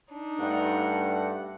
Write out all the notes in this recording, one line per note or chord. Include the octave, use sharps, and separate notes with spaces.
D4 D#4
G2 A3 F#5